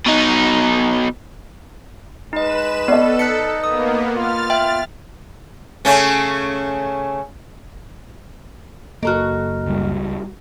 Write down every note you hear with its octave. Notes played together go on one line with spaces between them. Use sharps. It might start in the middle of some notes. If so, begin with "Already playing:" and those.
B2 D#4
G#3 D#4 B4 D#5 E7
B3 A4 D5 D#5
D#4 F#6 B6 C#7
A#3 B3 D#6
F4 F6 A6
E5 G5
C#3 A3 C#4
F#1 A#3 F#4 A4 A#4 D#5 A#5 F6
C#2 G3